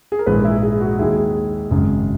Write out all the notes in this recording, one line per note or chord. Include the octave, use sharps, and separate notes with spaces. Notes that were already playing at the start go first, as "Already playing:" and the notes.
G#4
A#4
A#1 G#2 E3 A#3 G#4 B4
E4 G#4
E4 G#4
F#4
D#2 D#3 G#3 E4 G#4
G#1 F#2 C#3 G#3